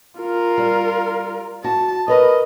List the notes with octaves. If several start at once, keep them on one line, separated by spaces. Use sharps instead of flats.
F4 A#4
G3
F#4 A5
A#4 B4 C#5 D#5